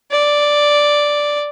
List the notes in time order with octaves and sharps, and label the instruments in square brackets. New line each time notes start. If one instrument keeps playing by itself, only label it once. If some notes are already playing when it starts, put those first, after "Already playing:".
[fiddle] D5